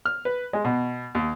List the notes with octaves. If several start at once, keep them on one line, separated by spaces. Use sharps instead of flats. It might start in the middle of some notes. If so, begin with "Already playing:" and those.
F6
B4
G#3
B2
D#2